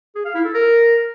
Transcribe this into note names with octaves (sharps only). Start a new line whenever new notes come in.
G#4
F5
E4
A4
A#4